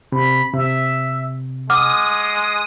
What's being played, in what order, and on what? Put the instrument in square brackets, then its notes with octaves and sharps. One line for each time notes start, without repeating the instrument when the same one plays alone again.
[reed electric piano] C3 [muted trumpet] B5
[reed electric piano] C3 [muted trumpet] E5
[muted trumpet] G#3 [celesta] F#5 D6 F6 [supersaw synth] D#6